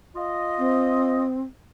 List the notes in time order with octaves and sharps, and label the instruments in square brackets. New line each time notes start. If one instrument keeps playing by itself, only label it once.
[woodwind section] F4 D#5
[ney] C4